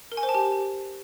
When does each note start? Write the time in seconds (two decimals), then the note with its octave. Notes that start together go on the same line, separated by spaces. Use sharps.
0.12 A#4
0.17 G#5
0.23 C5
0.29 A5
0.35 G4